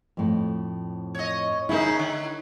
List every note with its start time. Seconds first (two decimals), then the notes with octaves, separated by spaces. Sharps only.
0.17 F2 A2
1.15 C#5 D#5
1.69 C#3 C#4 D#4 E4 A#4
1.99 D3